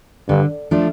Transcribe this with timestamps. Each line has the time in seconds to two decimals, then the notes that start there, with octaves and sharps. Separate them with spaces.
0.28 G2 D3
0.71 F3 A3 D4 F4